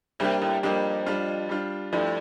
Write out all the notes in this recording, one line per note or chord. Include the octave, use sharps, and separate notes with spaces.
C3 G3 A#3 D4 G4
A2
F2 G3 A#3 D4 G4
G3 D4 F4
G3 D4 F4
G2 F3 A3 E4